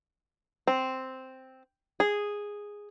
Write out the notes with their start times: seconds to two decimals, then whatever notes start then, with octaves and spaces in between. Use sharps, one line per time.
0.67 C4
2.00 G#4